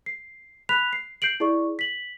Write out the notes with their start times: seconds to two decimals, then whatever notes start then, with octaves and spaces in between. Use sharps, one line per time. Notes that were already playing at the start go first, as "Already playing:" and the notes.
0.06 C7
0.69 B5 F#6 B6 F7
0.93 C7
1.22 G6 C7 D7 F#7
1.40 E4 G#4 D5 C#6
1.79 B6 F#7